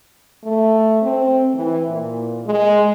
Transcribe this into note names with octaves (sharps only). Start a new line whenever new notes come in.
A3
C4
E3
A#2
G#3